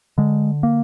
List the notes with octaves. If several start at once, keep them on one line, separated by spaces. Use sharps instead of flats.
D3 G#3
A#3